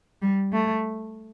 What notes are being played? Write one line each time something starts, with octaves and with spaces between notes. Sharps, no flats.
G3
A3